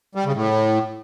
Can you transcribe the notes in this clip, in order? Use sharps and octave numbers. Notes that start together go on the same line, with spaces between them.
G3
C#3
A2